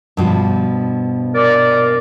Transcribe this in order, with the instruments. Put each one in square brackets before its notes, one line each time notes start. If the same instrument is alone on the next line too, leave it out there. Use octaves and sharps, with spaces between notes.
[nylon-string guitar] G2 B2 F3
[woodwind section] A#4 D5